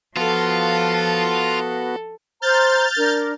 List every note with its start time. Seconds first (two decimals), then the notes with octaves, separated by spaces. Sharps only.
0.17 F3 B3 F4 F#4 A4 F5
2.42 C5 A#5 F6 G6 A6
2.97 D4 A#4